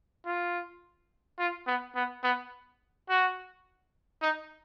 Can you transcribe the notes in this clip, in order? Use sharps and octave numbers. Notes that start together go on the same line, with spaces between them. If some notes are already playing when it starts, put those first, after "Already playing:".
F4
F4
B3
B3
B3
F#4
D#4